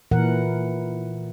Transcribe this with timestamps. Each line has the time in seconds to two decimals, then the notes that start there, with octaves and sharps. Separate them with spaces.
0.11 A#2 E3 A#4 F#5